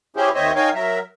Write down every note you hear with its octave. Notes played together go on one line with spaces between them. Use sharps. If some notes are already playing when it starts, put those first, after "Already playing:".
C#4 E4 G4 G#4 C5
D#2 C4 C5 C#5 D#5 E5
D#4 A#4 C#5 F5 G5 G#5
F#3 A#4 E5